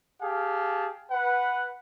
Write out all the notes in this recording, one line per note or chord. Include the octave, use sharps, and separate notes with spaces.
G4 G#4 F5 A5
B4 F#5